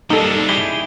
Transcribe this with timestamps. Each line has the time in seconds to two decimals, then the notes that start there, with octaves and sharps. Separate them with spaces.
0.10 C3 G3 A#3 D4 D#4 A4 G7
0.49 E4 G4 G#4 G7